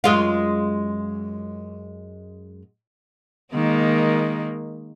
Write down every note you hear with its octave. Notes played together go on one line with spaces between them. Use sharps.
F#2 G#3 F4
D#3 G#3 A#3